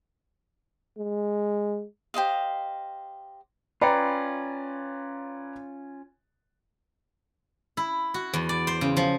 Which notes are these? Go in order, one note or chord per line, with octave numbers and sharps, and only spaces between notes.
G#3
G4 C5 D#5 F5
C#4 F4 B4 D5 G5 A#5 B5
E4
F#4
E2
D5
C5
C#3
F3